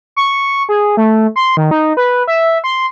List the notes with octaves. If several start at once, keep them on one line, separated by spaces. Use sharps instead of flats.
C#6
G#4
A3
C6
D#3
D#4
B4
E5
C6